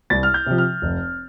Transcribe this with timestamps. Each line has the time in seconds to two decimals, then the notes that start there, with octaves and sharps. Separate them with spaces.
0.10 C2 A6
0.23 F6
0.34 G6
0.46 C3 F3
0.58 F6
0.82 F1